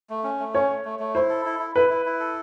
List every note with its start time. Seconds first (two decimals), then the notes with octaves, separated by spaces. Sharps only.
0.10 A3
0.24 C#4
0.40 A3
0.54 C#4 C#5
0.69 A3
0.85 A3
0.99 A3
1.15 E4 C5
1.29 A4
1.46 E4
1.60 E4
1.76 E4 B4
1.90 E4
2.05 E4
2.20 A4